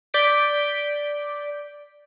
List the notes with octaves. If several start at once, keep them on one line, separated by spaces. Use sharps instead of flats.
D5 G6 B6 D7